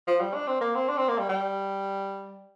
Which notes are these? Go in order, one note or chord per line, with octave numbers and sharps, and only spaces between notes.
F3
G3
D4
C4
A#3
C4
D4
C4
A#3
G3
G3